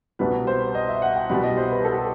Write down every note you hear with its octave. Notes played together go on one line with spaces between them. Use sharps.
C2 B2 G3 B3 B4
C5
D#5
E5
F#5
G5
C2 B2 G3 B5
D#5
C5
B4
A4
G4